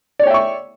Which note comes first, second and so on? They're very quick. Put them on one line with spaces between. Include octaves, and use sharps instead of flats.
D5 C#5 G5 E5 C#6